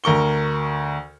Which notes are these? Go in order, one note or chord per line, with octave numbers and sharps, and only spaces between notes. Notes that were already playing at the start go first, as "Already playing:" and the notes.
D2 A#4 C#6 G7